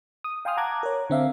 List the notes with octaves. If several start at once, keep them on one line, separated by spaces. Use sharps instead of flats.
D#6
F5 G5 G#5 C6 D#6 F6
F#5 A5 A#5 D6 F#6 G#6
A#4 C#5
D3 C4 E5 F5